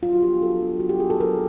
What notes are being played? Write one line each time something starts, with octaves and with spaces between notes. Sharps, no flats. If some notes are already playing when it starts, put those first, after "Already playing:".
F#3 F4
F#4
B3 D4 G4
F#3 A4
B3 D4
F#3 F#4
G4
B3 D4 G#4
A4
F#3 A#4